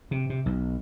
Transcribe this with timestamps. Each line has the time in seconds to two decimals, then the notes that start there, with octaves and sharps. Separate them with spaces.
0.11 C3
0.30 C3
0.46 B1